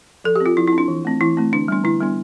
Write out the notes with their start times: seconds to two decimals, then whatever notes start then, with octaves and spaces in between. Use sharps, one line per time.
0.24 F3 A4
0.36 G4
0.40 C4
0.46 F4
0.57 F3 E4
0.67 E4
0.73 C4
0.78 D4
0.88 E3
1.05 A3 C4
1.21 E3 E4
1.37 A3 C4
1.52 D3 D4
1.68 G3 B3 D4
1.84 D3 E4
2.00 G3 B3 D4